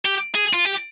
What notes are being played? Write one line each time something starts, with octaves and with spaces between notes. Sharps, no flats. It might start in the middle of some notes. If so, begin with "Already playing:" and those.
G4
G#4
F4
G4